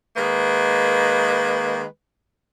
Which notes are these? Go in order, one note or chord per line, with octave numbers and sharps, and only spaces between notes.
D#3 G#3 A#3 B4